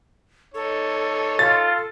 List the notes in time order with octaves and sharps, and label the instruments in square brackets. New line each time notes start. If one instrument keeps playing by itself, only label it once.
[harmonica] D#4 C#5 [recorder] A4
[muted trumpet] F4 [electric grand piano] A6